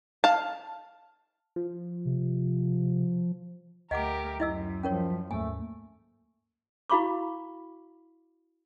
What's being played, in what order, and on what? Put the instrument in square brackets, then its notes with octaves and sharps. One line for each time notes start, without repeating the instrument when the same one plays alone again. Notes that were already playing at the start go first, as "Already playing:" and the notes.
[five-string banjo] F5 A5
[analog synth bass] F3
[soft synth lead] C3
[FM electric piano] D2 B6 [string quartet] A3 G4 A#4 [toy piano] D#5 F#5 D6
[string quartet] F#2 [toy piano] E4 D#5 E6
[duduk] F3 [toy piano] C#4 A#4 C#5
[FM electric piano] D#2 G#2 A#3 [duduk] A3 [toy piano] G#5
[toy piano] E4 F#4 F5 B5 C#6 D6